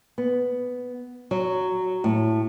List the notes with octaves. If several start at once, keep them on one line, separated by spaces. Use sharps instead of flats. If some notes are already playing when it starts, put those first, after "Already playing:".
B3
F#3
A2